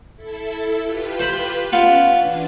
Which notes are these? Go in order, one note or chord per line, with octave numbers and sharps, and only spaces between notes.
E4 A4
F4 G4 B4
C5 B5
B3 C#4 F4
E3 D4